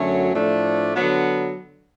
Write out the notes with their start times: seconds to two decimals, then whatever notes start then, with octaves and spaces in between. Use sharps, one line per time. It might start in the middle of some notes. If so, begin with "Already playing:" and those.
Already playing: F#2 D3 F#3 A3 C#4
0.32 A2 F3 A3 D4
0.94 D3 F#3 B3